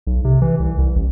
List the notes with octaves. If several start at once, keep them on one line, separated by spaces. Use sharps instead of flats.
B1
C3
E3
C2
C2
A1